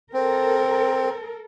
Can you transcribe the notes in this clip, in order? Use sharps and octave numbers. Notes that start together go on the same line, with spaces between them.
C4 A4 A#4